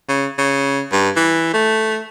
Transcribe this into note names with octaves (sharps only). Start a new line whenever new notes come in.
C#3
C#3
G2
E3
A3